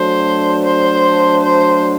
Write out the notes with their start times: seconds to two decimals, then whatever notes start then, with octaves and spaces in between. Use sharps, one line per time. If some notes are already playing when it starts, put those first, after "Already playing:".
Already playing: F#3 A3 D4 C5
0.64 C5
1.42 C5